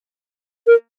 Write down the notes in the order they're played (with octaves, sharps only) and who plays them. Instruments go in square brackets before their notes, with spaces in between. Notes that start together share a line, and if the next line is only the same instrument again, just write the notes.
[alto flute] A#4